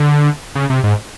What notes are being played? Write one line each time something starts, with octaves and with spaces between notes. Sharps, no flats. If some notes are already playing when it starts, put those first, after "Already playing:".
Already playing: D3
C#3
C3
G#2